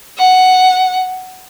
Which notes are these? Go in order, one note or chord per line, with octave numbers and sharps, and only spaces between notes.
F#5